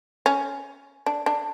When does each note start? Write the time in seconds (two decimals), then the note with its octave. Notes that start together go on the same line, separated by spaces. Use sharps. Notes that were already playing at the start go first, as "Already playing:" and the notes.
0.26 C#4
1.06 D4
1.26 D4